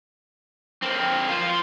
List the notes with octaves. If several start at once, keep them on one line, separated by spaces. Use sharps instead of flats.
A#3 C4
F4 C5